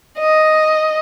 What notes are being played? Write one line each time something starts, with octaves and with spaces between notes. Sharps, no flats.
D#5